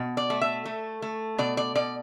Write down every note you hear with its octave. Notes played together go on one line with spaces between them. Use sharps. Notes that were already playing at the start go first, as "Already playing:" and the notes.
Already playing: B2
D5
A3
E5
A3
A3
B2 D5
D5
B2 D5